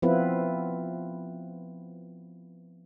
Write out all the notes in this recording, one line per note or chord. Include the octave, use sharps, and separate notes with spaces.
F3 B3 C4 E4 F4 B4